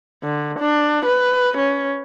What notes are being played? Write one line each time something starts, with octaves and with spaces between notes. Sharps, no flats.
D3
D4
B4
C#4